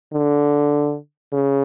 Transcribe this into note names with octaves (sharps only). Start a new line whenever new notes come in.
D3
C#3